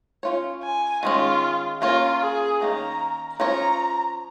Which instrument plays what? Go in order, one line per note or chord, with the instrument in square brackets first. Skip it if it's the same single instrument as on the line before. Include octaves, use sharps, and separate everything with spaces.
[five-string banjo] C#4 F4 C#5
[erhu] G#5
[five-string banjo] D#3 G#3 C#4 [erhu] F4
[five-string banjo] A#3 C#4 A#4 C#5 [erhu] F4
[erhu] G#4
[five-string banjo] D#3 A#3 C#4 [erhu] A#5
[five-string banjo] F3 C#4 A#4 C#5 [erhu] A#5